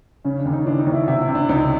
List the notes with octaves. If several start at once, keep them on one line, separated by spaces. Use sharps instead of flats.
C#3 C#4
D4
D#2
D#4
E3 D4
D#4
D#2
E4
C3 E4
E4
C3
D4
C#2 D#4